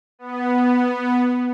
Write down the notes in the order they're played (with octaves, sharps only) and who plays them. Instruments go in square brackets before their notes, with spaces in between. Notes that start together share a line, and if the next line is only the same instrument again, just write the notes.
[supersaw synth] B3